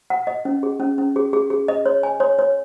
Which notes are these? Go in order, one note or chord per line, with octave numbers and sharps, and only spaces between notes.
F#5
D#5
C#4
G#4
C#4
C#4
G#4
G#4
G#4
D#5
C#5
G#5
C#5
C#5